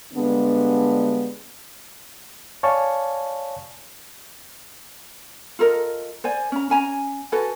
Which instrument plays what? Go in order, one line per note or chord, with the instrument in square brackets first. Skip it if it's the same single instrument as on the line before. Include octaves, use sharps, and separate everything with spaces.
[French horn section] G2 D3 G#3 B3 D4
[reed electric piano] C#5 D5 F5 G#5 A5 C#6
[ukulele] F4 A4 A#4 D#5
C5 D5 G#5
C#4 A#5
C#4 G#5 A#5
F#4 A4 B4 G#5